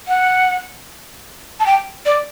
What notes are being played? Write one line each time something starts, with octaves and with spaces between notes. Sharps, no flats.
F#5
A5
G5
D5